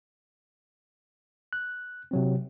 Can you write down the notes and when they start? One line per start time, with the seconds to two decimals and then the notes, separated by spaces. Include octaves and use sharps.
1.53 F#6
2.11 C3 F#3 C4